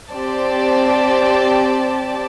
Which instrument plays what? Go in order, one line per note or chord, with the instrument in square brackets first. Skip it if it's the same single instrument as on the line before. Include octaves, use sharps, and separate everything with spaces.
[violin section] C4 G4 D5 A5